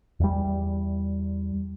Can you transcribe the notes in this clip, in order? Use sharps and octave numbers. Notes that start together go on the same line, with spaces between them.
E2 G3